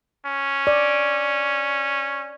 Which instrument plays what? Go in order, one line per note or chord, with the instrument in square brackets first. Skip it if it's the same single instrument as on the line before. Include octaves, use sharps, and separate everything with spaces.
[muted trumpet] C#4
[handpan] D5